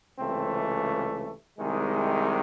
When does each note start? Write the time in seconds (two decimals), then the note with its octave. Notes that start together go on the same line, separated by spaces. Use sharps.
0.18 C#2 C3 E3 A3 C4
1.59 C2 C3 D#3 G#3